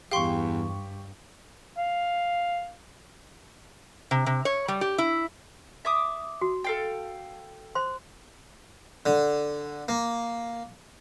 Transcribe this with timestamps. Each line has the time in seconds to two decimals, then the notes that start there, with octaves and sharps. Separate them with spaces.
0.11 E2 G2 G4 F5 G5 C6 C#6
1.78 F5
4.11 C3
4.26 C3
4.45 C#5
4.68 G3
4.81 G4
4.98 E4
5.85 E5 D6 D#6
6.41 F#4
6.64 A4 F5 G5
7.75 C5 C6
9.06 D3
9.88 A#3